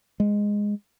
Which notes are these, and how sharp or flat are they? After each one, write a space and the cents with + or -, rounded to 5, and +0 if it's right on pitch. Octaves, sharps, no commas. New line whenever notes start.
G#3 -10